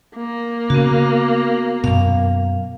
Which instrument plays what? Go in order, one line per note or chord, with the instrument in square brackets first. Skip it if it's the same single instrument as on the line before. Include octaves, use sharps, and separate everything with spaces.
[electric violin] A#3
[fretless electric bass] C#3 [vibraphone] B3 F#4
[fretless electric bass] F#2 B2 [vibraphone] F5